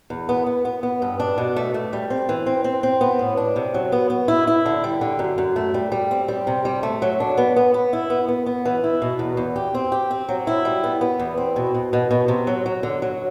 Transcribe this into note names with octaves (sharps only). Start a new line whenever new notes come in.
E2
B3
B3
B3
B3
G2
D4
B2
A3
A3
G3
C4
E3
C4
C4
C4
B3
A2
D4
C3
F#3
B3
B3
E4
E4
D3
G3
D3
F#2
F#2
A3
G3
G3
C4
G3
C3
G3
A3
F#3
D4
B3
B3
B3
E4
B3
B3
B3
E3
E4
B2
E2
E2
G4
C4
G4
C4
F#3
E4
G3
B3
B3
E2
C4
B2
B2
B2
B2
C3
F#3
F#3
D3
F#3